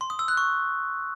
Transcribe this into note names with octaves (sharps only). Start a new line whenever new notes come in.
C6
D#6
E6
F#6
C#6